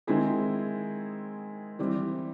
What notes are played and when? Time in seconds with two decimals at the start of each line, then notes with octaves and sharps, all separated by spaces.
0.07 D#3 G#3 C4 E4 G#4
1.79 E3 G3 C4